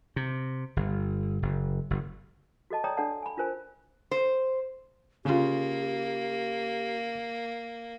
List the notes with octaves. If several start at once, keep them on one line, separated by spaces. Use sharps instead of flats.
C3
G1
F#1
F#1
F#4 A4 D#5 A5
C#5 D5 G5 A#5 D#6
D4 A4 D5 F#5 A5
G#5 B5
D4 F4 A#4 C5 G#5
C5
C#3 A#3 F4 G4